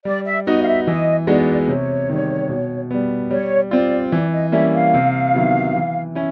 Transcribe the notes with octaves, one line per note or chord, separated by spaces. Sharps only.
G3 D5
E5
B3 D#4 F#4 D#5
F5
E5
E3 D#5
G#3 B3 D#4 F#4 D5
C3 C#5
D#3 G3
B2
G3 B3
G3 C#5
C4 F4 D5
E3 D5
D#5
G3 A#3 C#4 E4 E5
F5
C3
D#3 F#3 B3 E4
E3
C#4 E4